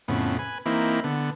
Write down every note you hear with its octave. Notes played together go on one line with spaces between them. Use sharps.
F2 A2 C#3 B3
B4 G#5
E3 A#3 C4 D#4 E4
D3 B3